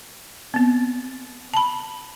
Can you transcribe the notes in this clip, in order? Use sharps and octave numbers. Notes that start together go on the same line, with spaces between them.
B3 C4
A5 B5